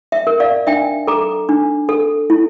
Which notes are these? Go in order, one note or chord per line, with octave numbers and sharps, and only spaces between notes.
E5
A#4
D5 F5
D4 E5 G5
A4 A#5 D6
D4
A4
E4